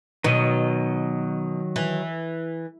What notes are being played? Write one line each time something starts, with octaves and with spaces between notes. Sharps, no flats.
B2 D#3 F#3 D#5
E3